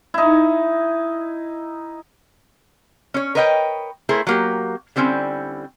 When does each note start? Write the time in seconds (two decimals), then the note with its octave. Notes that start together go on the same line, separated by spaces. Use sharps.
0.14 D#4 E4
3.14 C#4 C#5
3.35 A#4 B4 C#5 D#5 E5 G5
4.09 A3 E4 G#4 A#4 C5
4.27 F#3 A#3 G4
4.96 D3 G3 C4 C#4 E4